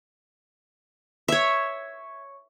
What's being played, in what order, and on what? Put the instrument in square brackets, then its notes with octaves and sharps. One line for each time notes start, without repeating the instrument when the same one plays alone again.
[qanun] C#5 E5